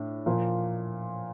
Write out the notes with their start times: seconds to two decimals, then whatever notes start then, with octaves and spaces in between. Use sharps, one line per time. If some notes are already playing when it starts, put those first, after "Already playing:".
Already playing: A2 D4
0.26 A#2 F3 A#3 F4